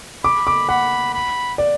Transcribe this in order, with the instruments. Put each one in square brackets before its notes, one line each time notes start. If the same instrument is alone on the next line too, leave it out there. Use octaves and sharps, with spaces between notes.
[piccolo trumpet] B5 [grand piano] D6
[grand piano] D6
[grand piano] F#5 [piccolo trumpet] B5
[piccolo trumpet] B5
[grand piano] D5